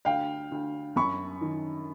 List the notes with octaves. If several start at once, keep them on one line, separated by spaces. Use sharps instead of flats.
D2 F5 G5
D2
F#2 B5 C#6
D#3